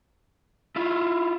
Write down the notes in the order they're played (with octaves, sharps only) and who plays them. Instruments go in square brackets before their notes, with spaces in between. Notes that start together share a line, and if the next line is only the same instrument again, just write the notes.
[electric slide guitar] E4 F4